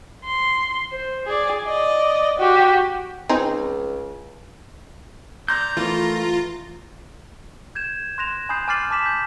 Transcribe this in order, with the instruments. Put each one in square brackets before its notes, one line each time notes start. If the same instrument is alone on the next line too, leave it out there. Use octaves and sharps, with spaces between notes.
[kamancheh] C6
C5
G#4 D5
D5 D#5
F#4 G4
[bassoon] C#2 [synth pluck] C4 D#4 G#4
[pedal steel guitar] D5 C6 G6 [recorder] A#5
[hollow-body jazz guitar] E3 [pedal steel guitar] A3 A#4 [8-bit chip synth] F4
[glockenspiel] G6 G#6 E7
C6 F#6 A#6 E7 F7
G#5 B5 D#6 G6 C7
G#5 D6 F6 A6 C7 F#7
G#5 A5 D6 B6 E7
G6